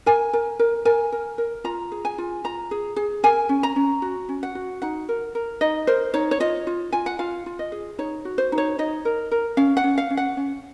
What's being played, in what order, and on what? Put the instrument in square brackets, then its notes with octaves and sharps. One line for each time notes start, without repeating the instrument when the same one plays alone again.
[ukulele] A#4 G#5
A#4
A#4
A#4 G#5
A#4
A#4
F4 A#5
G#4
G#5
F4
F4 A#5
G#4
G#4
A#4 G#5
C#4
A#5
C#4
F#4
C#4
F#5
F#4
D#4 F#5
A#4
A#4
D#4 D#5
A#4 C5
D#4 C#5
C#5
F4 D#5
F4
F4 G#5
F#5
F4 F5
F4
D#5
G#4
D#4 C#5
F#4
C5
D#4
C#5
D#4 D#5
A#4
A#4
C#4 F5
F#5
C#4
F5
C#4
F#5
C#4